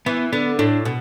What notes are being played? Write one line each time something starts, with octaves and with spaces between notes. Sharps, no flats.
E3 B3
D3 B3
A2 D4
B2